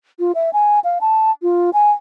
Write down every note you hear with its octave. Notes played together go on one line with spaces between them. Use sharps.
F4
E5
G#5
F5
A5
F4
G#5